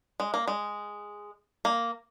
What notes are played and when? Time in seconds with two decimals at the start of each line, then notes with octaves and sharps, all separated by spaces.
0.20 G#3
0.34 A#3
0.47 G#3
1.65 A#3